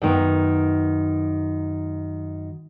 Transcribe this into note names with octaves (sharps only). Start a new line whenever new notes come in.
F#2 D#3 B3